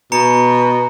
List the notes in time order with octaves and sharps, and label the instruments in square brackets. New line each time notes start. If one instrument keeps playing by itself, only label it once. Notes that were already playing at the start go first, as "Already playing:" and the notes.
[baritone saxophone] B2 [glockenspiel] A#5 C#7